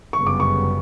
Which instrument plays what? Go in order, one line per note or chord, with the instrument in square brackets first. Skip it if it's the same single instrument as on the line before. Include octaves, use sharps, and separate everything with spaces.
[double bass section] G1 F#2 C#3 G3 B3 [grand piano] C#6
[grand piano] D6
C#6